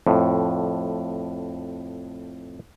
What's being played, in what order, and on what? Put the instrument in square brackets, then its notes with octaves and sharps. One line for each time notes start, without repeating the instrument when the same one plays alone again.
[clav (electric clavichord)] F2 A2